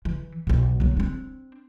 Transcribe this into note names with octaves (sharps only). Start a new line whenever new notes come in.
E3
B1 B2
F#3 A#3
C4 D4